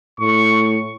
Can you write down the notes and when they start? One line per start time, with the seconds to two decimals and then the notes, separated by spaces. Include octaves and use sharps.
0.20 A2 C#6